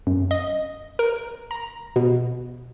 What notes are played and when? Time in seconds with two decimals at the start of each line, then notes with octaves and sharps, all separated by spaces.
0.07 F#2
0.31 D#5
0.99 A#4
1.51 A#5
1.96 B2